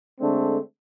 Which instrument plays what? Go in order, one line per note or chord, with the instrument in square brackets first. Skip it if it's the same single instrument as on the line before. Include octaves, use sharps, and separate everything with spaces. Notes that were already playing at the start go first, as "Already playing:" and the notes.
[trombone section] D3 G#3 A3 C4 D4